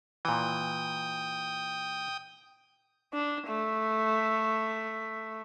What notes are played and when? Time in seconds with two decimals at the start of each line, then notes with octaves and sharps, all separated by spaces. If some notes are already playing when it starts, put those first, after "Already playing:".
0.25 A#2 E3 G5 D#6
3.14 D4
3.48 A3